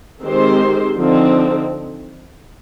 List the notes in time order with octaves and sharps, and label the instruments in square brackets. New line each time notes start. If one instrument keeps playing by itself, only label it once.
[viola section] D#3 G#3 C4 G4 C5
D3 F3 C4 D#4